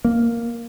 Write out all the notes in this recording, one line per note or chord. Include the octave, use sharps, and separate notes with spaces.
A#3